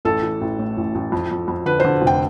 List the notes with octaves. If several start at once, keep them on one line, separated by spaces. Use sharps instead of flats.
A1 A4
E3
A1
A2
A1
A1
F2
F2
F2
D3 B4
D3 C5
F1
G5